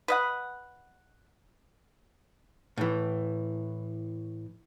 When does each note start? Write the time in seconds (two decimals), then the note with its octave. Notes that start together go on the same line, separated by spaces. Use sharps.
0.08 B4 D#5 F#5
2.77 A2 E3